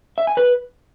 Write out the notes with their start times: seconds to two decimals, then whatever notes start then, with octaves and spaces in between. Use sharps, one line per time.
0.18 E5
0.27 G#5
0.37 B4